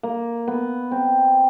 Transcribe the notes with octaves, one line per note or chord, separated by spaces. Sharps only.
A#3
B3
C4